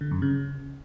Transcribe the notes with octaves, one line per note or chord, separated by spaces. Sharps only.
D3
F#2
C#3